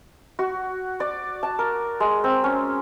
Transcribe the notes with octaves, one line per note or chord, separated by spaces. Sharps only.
F#4
D5
A5
A#4
G#3
C4
C#4